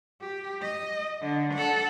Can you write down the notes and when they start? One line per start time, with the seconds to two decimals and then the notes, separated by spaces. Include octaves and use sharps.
0.22 G4
0.62 D#5
1.22 D3
1.53 A4 F#5